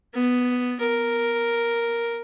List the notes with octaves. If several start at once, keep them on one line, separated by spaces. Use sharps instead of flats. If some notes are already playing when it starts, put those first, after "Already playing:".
B3
A#4